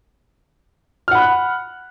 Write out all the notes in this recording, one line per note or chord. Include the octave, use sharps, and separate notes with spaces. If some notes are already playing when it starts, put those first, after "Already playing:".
F#5 B5 F6 F#6